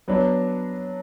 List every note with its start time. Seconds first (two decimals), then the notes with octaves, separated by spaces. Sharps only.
0.08 F#3 B3 D4